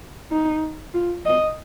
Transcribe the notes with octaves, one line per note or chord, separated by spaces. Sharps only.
D#4
F4
D#5